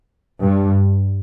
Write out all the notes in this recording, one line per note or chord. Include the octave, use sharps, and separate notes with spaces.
G2